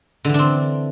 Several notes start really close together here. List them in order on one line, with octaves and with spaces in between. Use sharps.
D3 E3 D4 C4